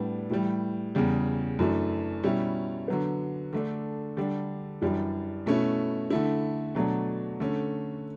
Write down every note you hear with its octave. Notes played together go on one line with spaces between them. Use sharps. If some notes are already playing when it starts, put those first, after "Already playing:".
Already playing: A2 G3 B3 D4
A2 E3 G3
E2 C#3 G3
F#2 E3 A3 D4
B2 G3 C#4 E4
D3 F#3 B3
D3 A3 D4
D3 G3 D4
F#2 E3 G3 D4
B2 A3 C#4 E4
D3 A3 E4
B2 F#3 A3 D4
D3 A3 C#4